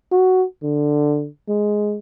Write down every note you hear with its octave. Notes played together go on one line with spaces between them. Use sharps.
F#4
D3
G#3